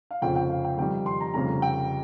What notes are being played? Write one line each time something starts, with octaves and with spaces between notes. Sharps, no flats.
F5
F1 F2 C#3 F3 G5
G5
F5
G5
F2 D#3 G3 G5
C6
A#5
F1 F2 C#3 G3 A#5
G5